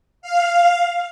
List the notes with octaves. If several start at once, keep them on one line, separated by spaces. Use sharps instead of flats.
F5